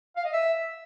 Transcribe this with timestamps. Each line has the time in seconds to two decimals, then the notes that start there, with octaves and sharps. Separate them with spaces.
0.16 F5
0.25 D#5
0.33 E5